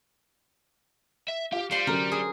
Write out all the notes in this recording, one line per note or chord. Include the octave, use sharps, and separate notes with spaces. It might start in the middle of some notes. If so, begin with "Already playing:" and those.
E5
F4 G4 F5
G3 C5 C6
D3 F#3 C#4 A#4
G#4